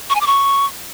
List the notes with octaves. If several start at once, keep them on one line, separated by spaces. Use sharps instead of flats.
C#6
G#5
D6
C#6